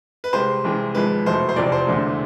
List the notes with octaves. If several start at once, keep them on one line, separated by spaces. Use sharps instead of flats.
B4
C2 C3 G#3 C5
C2 C3 E3 G#3
G#1 G#2 F3 G#3 B4
F1 E2 B2 A3 C5
C5
F1 E2 C3 F3 D5
C5
E1 E2 D3 A3